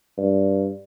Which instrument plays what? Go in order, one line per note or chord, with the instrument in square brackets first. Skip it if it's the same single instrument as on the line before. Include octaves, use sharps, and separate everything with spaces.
[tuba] G2